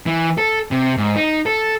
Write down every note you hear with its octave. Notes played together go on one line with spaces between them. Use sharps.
E3
A4
C3
G#2
D#4
A4